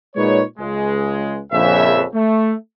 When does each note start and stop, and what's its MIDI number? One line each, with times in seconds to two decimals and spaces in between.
0.16 0.42 46
0.16 0.42 56
0.16 0.42 63
0.16 0.42 71
0.16 0.42 73
0.58 1.39 37
0.58 1.39 56
1.52 2.03 34
1.52 2.03 41
1.52 2.03 49
1.52 2.03 76
2.14 2.53 57